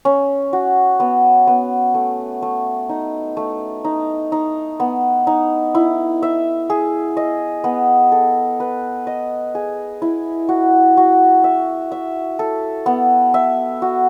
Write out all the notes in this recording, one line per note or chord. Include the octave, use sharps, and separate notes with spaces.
C#4
F#4
B3
B3
A3
A3
D#4
A3
D#4
D#4
B3
D#4
E4
E5
G#4
D#5
B3
A4
B4
D#5
G#4
E4
F#4
F#4
E5
E5
A4
B3
E5
F#4